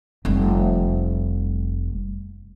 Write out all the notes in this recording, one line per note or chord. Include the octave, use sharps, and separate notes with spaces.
F1 G3